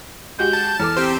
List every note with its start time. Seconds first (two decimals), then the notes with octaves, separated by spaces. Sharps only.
0.39 G#3 F#4 G4 G6
0.53 A5
0.80 E2 A4 D6 F6
0.97 C4 G4 C5